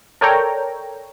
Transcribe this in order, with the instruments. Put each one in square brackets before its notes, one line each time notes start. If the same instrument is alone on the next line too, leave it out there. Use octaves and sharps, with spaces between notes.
[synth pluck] A4 A#4 C#5 D5 G5 A#5